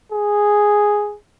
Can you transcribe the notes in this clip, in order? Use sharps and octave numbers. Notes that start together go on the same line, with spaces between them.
G#4